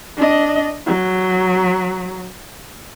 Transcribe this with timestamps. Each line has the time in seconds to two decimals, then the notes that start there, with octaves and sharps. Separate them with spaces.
0.17 D4 D#5
0.87 F#3